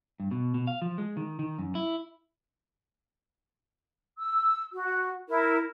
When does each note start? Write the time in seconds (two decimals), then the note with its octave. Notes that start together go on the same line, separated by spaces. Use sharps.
0.20 G2
0.31 B2
0.54 B2
0.67 F5
0.82 F3
0.98 G#3
1.17 D#3
1.39 D#3
1.58 F#2
1.75 E4
4.18 E6
4.73 F#4
5.28 E4 A#4